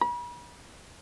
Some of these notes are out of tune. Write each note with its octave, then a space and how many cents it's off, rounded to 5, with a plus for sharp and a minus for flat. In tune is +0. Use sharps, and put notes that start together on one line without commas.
B5 -40